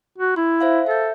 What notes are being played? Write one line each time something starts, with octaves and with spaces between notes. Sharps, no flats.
F#4
E4 C6
C5 E5 F5
A4 E5 G6